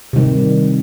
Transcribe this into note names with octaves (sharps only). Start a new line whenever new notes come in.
C3 D#3 G3